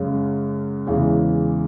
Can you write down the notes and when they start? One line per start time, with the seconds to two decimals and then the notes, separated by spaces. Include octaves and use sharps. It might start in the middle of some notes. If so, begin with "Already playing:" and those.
Already playing: F#2 C#3 G#3
0.86 E2 C#3 E3 G#3